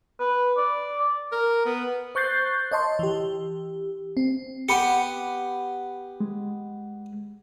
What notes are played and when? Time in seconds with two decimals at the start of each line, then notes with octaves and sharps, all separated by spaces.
0.20 B4
0.57 D5
1.32 A#4
1.66 B3
2.15 C5 C#6 F#6 G6 A6 C7
2.71 C#5 D#5 A5 C6
2.99 E3 G4
4.17 C4
4.69 B3 G4 B5 C#7
6.20 G#3